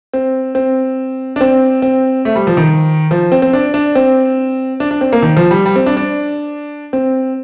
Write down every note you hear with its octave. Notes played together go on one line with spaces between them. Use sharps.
C4
C4
D4
C4
C4
A3
G3
F3
D#3
F3
C4
C4
D4
D4
C4
D4
D4
C4
A#3
D#3
F3
G3
G3
C4
D4
D4
C4